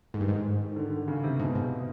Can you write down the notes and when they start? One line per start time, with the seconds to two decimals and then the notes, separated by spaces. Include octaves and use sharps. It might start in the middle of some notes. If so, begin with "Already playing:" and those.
0.14 G#2 D#3
0.21 G2
0.28 G#2
0.71 D#3
0.76 D3
0.92 D3
1.08 C#3
1.24 C3
1.39 G#2 B2
1.55 G#2